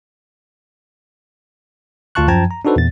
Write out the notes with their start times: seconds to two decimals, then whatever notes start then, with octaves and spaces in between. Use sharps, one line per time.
2.15 D2 F4 F5 A5 C#6 F#6
2.28 F#2 F3 G5 A5 A#5 G#6
2.51 A#5
2.65 D4 D#4 F#4 A4 B4 C5
2.76 E2 A#2 A6